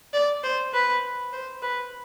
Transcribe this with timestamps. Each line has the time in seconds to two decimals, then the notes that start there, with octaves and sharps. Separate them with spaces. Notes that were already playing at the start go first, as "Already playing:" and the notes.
0.14 D5
0.43 C5
0.73 B4
1.32 C5
1.62 B4